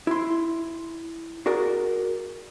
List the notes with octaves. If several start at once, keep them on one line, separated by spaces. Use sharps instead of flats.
E4 C6
F#4 G#4 A#4 D5